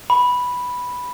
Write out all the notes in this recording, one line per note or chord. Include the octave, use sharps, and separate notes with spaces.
B5